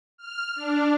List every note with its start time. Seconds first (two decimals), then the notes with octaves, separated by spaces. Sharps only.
0.18 F6
0.56 D4